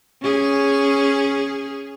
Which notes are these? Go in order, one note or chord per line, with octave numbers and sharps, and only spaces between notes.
C#4 G#4